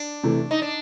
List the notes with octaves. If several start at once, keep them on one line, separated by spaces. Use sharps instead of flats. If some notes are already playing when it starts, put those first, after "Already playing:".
Already playing: D4
C3 E3 A3
D#4
D4